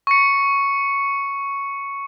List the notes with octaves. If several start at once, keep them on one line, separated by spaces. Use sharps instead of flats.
C#6 C#7